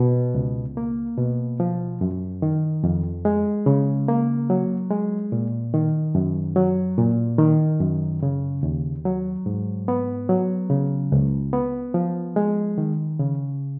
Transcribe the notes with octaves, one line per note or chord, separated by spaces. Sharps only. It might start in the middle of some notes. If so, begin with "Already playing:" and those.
Already playing: B2
C#2
A#3
B2
F3
F#2
D#3
F2
G#3
C#3
A#3
F#3
G#3
A#2
D#3
F#2
F#3
A#2
D#3
F#2
C#3
D#2
F#3
G#2
B3
F#3
C#3
C#2
B3
F3
G#3
D#3
C#3